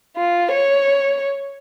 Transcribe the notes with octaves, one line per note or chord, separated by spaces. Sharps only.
F4
C#5